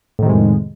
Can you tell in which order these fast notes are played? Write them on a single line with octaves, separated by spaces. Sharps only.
A2 D#3 C3 G#3 F2